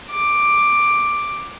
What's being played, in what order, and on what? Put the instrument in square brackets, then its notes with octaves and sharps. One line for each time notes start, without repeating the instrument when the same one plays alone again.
[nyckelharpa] D6